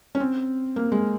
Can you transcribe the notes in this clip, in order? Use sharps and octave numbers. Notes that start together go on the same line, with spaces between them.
C#4
C4
A#3
G#3